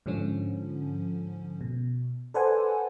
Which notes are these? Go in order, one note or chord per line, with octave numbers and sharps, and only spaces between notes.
G#2 D3 F3 C#4
B2
A4 B4 C5 D5 F#5 G#5